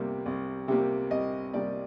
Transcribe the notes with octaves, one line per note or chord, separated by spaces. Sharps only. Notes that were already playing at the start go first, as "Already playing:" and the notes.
Already playing: C2 C3 G3 A#3
C2
C3 G3 A#3
C2 D#5
C3 G3 A#3 D5